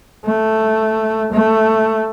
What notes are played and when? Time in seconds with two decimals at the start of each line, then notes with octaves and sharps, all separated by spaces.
0.25 A3
1.33 A3